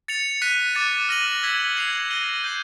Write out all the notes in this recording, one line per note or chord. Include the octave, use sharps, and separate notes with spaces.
A6 C#7 F7
F#6 B6 D#7
D6 F#6 A6 C#7
F6 A#6 D#7 F#7
E6 G#6 B6
G#6 C7 F7
F6 A#6 D#7 G7
G6 C7 D#7